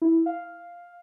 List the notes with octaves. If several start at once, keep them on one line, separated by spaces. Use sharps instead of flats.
E4
F5